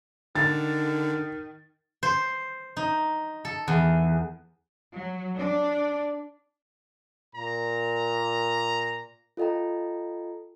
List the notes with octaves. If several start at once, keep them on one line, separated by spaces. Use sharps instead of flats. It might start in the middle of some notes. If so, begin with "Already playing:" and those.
D3 D#3 A6
C5
D#4
A4
E2
F#3
D4
A#2 A#5
F4 A4 D#5 G5 A#5